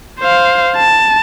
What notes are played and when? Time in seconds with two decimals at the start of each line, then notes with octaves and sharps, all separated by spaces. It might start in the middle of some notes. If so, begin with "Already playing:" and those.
0.20 C5 F5
0.77 A5